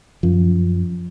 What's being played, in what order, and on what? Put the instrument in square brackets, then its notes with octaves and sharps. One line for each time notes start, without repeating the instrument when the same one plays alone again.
[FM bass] F#2 [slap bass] F3